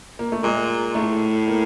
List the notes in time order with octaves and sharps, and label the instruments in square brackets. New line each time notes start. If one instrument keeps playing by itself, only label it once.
[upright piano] A#3
A3
[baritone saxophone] A#2 [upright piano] G#3
[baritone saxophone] A2 [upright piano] A3
[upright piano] A#3